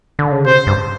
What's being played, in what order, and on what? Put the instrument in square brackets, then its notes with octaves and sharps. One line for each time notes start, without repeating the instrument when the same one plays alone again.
[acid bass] D3
C#3
[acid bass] C3 [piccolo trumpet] C5
[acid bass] G2